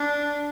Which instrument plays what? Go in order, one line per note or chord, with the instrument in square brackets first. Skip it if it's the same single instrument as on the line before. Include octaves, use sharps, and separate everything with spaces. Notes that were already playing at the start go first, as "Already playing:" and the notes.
Already playing: [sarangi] D4